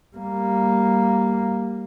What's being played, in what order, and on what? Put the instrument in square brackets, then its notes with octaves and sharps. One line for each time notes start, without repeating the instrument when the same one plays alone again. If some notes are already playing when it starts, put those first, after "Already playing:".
[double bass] G3 A#3